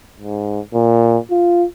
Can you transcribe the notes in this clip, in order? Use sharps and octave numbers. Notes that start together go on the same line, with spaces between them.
G#2
A#2
F4